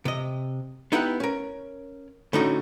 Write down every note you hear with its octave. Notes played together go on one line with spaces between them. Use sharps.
C3 D#5
B3 D#4 E4 G4 F#5
C#4 A#4
A2 D3 C#4 D#4 F#4